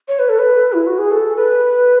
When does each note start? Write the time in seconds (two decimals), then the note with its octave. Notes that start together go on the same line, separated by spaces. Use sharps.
0.08 C#5
0.19 B4
0.29 A4
0.39 B4
0.73 E4
0.86 F#4
0.98 G#4
1.11 A4
1.36 B4